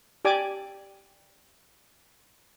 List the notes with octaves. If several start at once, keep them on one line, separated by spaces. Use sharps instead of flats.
G4 D5 G#5 D6